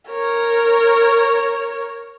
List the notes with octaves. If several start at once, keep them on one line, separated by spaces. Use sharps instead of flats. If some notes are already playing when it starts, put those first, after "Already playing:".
A#4 C#5